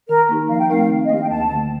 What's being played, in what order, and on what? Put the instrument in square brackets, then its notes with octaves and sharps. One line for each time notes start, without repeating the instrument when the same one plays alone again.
[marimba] D#3 [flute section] A#4
[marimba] A#3 D#4 G4
[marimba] F3 [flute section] F5
[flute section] G5
[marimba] A3 C4 D#4 A#4 [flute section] F5
[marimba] D#3
[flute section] D#5
[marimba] A#3 D4 G4 [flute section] F5
[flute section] G5
[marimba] D2 [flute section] A5
[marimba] D3 A3